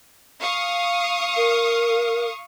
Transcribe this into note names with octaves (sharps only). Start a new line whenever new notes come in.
F5 C#6 D#6
A#4